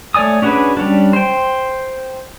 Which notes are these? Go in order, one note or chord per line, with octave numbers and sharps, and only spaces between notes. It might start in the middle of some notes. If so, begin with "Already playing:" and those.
A3 C#5 D5 G#5 D#6
C#4 D4 F#4 G#4 B4
G3 C#4 D4
C5 G5